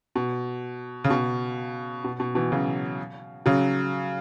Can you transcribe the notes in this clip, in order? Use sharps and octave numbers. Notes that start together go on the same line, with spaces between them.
B2
C#3
B2
B2
B2
B2 E3
C#3 F#3
C#3 F#3